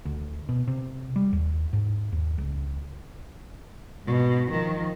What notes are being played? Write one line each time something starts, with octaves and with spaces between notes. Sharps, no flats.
D2
B2
C3
G3
D#2
G#2
D#2
C#2
G#2 B2
D#3 F3